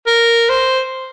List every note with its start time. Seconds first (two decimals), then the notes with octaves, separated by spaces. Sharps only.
0.07 A#4
0.49 C5